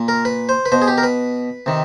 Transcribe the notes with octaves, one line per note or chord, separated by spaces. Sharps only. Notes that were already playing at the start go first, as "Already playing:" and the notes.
Already playing: A#2
A#4
B4
C5
B4
B2 C5
G#4
G4
A#4
B4
C3 D#3